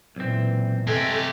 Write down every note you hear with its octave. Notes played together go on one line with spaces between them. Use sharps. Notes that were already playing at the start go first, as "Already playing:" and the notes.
B1 A#2 E3 C4
C3 G#3 A3 G4 A4